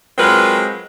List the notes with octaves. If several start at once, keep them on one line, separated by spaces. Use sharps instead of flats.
F#3 G#3 C4 F4 A#4 B4